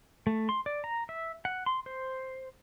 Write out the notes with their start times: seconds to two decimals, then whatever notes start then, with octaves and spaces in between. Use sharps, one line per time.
0.27 A3
0.49 C6
0.66 D5
0.84 A#5
1.09 E5
1.45 F#5
1.66 C6
1.86 C5